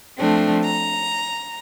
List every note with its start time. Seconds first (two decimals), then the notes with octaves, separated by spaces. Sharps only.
0.19 F3 A3 C4 D4
0.65 A#5